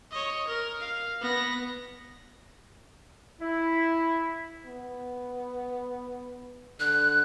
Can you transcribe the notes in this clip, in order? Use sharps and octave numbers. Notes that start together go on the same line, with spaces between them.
C#5 D#5
A#4
F5
B3 A#6
E4
B3
D3 F#6